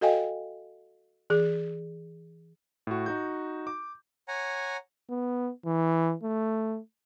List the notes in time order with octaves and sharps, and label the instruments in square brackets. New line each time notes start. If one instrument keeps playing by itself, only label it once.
[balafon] F#4 A4 D#5 F5 G5 G#5
E3 G#4
[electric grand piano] A2 F#4
D#4 F#4 G6
D6
[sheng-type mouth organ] C#5 F#5 G#5 A#5
[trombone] B3
E3
A3